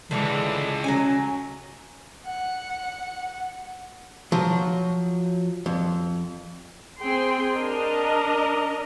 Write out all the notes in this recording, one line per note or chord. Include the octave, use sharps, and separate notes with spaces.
C#2 A2 D3 E3 G#3
F#3 C#4 G#5
F#5
F3 F#3
F2
C4 G#4 G5 C6
D4 A#4 D#5